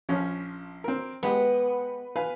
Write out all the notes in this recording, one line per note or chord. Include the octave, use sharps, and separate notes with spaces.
A#1 F3 C#4
C4 A#4
G#3 B3 G4
B4 F5 G#5